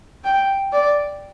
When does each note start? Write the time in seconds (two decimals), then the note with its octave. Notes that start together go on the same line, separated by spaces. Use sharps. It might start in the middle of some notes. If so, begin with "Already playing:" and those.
0.24 G5
0.72 D5